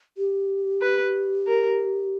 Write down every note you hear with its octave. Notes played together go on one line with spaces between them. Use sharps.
G4
B4
A#4